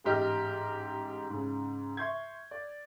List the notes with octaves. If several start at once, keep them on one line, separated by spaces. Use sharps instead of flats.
A1 G#2 G4 D#5 F6
G#2 C#3
E5 C6 C#6 G6 G#6
D5